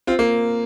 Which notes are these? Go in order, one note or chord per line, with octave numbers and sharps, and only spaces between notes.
C4 F4
A#3